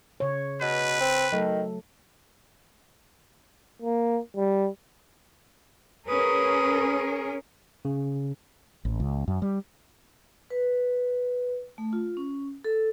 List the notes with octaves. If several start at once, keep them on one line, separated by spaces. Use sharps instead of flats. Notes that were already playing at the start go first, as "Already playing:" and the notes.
C#3 C#5
B2 B4
C4
D#3 F#3 A3 A4
A#3
G3
C#4 G#4 A#4 B4 D#6
C#3
A1
C#2
F#2
G3
B4
A3
F4
C#4
A4